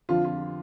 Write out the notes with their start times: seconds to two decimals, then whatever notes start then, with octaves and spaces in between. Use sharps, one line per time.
0.09 F2 D3 F3 F4
0.25 F4